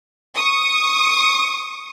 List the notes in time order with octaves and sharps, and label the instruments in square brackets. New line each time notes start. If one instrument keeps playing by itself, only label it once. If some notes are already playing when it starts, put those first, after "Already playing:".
[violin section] C#6 D#6